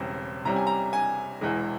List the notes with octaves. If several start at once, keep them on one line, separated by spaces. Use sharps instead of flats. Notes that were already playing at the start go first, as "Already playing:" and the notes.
Already playing: E1 E2 C#3 G3 C4
C2 C3 G3 C#4 A#5
G#5
A#5
G#5
E1 E2 E3 G#3